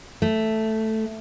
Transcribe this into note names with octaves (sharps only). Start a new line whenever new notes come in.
A3